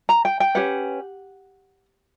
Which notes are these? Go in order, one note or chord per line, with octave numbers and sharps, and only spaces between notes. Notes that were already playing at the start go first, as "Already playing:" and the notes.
A#5
G5
G5
C#4 G4 B4 F#5